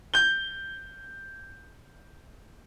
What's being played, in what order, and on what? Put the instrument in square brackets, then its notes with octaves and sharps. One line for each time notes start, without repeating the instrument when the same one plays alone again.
[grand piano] G6 G7